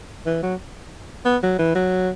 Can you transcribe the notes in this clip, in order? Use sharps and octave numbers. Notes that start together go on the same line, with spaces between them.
E3
F#3
B3
F#3
E3
F#3